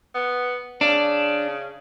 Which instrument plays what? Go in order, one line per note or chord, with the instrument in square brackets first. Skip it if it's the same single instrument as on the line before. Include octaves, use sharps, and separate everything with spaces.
[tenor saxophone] B3
[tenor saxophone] C#3 [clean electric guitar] D4